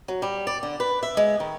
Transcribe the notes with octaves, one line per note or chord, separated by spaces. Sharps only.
F#3
G3
D5
D3
B4
E5
G#3
D#3